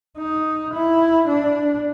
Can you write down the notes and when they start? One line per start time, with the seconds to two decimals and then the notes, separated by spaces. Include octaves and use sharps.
0.18 D#4
0.74 E4
1.28 D4